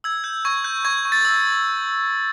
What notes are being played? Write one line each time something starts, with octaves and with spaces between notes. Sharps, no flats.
E6 G#6
G6
C#6 G#6
G6
C#6 G#6
C#6
A6
E6